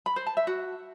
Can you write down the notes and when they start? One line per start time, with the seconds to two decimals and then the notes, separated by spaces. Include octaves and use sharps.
0.06 B5
0.16 C5
0.27 A5
0.37 E5
0.47 F#4